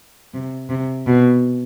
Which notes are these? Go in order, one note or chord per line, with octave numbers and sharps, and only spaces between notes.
C3
C3
B2